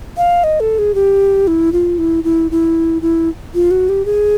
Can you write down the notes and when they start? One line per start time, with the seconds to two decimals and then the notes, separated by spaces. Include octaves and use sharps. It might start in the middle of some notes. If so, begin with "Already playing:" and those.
0.17 F5
0.44 D#5
0.60 A4
0.79 G#4
0.95 G4
1.47 E4
1.72 F4
1.98 E4
2.24 E4
2.51 E4
3.02 E4
3.54 F4
3.71 F#4
3.89 G4
4.05 G#4